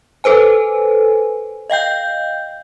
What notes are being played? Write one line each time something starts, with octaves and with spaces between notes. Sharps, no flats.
A4 B4 C5 G#5
D#5 F5 G5 G6